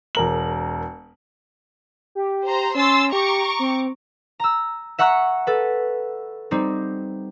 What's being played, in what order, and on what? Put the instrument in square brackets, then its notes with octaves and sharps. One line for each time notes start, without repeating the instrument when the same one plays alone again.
[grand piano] E1 A#4 F#7
[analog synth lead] G4
[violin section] C5 A#5
[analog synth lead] C#4 [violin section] C6 E6 A6
[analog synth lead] G4 [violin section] A#5 C#6 D6
[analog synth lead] C4
[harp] A#5 E6
E5 F#5 A#5 C#6 F#6
A4 B4
G3 C4 D#4